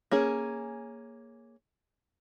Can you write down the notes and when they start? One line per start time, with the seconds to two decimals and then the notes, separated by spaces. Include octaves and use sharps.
0.11 A#3 C#4 G#4